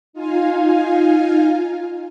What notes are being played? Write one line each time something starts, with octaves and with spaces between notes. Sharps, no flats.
D#4 F4 F5 G#5